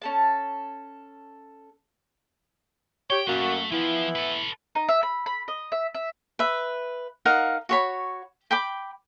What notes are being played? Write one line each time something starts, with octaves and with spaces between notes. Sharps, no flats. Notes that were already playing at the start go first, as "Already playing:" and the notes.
C#4 A4 A5
G4 C#5 G5
B1 F#2 G3 A#3 F#4
A3
E3 F3 B3 E4
A4 B4
D#4
E5
B5
B5
D#5
E5
E5
B4 E5
D#4 A#4 F5 F#5
F#4 C#5 B5
G5 B5 D6